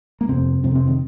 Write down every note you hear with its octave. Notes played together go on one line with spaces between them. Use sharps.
A#3
F2 C3 C4
F2 C3 C4
C4
D#3